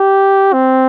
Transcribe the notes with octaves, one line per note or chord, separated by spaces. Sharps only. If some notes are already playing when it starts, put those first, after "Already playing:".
Already playing: G4
C4